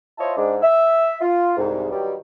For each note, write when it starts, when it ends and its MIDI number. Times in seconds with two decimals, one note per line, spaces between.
0.18 0.33 64
0.18 0.33 65
0.18 0.33 72
0.18 0.33 73
0.18 0.33 75
0.18 0.33 81
0.37 0.57 44
0.37 0.57 56
0.37 0.57 62
0.62 1.15 76
1.21 1.56 65
1.57 1.90 36
1.57 1.90 44
1.91 2.14 43
1.91 2.14 51
1.91 2.14 54
1.91 2.14 55